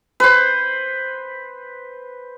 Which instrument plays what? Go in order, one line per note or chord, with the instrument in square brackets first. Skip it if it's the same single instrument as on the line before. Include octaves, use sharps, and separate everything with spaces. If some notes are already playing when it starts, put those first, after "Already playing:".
[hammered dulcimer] B4 C5